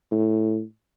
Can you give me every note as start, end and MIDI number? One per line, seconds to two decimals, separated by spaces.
0.12 0.62 45